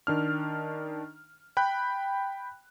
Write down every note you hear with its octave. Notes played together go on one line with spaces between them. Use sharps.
D#3 D4 F6
G5 B5 F#6